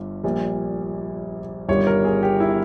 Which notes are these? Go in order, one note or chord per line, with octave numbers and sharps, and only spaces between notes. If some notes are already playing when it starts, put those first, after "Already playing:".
Already playing: G1 G2
A#1 A#2 G3
G1 G2 D#3 G3 C#5
A#4
G#4
G4
E4